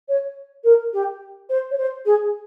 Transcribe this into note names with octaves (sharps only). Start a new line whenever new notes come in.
C#5
A#4
G4
C5
C#5
C5
G#4